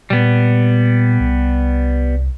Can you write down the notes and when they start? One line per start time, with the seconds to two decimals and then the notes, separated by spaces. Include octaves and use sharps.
0.10 A#2 G3 B3
1.20 C2